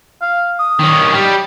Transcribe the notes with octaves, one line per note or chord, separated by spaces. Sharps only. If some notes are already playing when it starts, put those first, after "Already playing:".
F5
D#6
D#3 C#4
G3